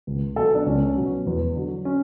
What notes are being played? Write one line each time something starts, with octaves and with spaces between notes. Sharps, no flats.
C#2
B2 F#3 A4
D4
C#2 C#4
B2 F#3
E2
D3 F#3
C#4